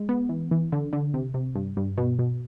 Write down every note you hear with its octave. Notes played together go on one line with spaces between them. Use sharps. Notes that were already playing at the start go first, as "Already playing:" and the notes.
Already playing: G#3
B3
E3
E3
D3
D3
C3
C3
G2
G2
B2
B2